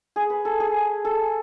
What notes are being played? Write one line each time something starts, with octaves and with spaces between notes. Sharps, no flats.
G#4
B4
A4
G#4
A4